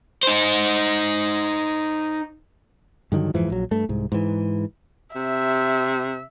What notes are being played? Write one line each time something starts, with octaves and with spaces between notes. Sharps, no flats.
D#4 C5
G2 D3 D#3 F#3
F2 G#2 E3 F3
A#1 F#3
G2 A3
C2 G#2
G#2 E3
C3 E5